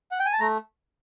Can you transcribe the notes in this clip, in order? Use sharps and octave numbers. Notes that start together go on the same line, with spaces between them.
F#5
G5
G#5
A5
A3 A#5